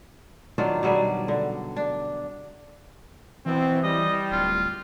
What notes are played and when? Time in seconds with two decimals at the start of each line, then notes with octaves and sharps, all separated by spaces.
0.58 D#3 F#3 D4 F4
0.83 B2 F#3 G3 G#4
1.28 D3
1.76 D4
3.46 B2 E3 C4
3.83 G3 D#5
4.32 D1 F4